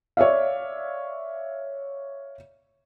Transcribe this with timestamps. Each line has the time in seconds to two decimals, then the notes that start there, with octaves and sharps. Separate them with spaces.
0.17 C#5 D5 E5 F5